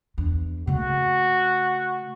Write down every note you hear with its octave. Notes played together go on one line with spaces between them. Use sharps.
E2 D4
C#3 A3 F#4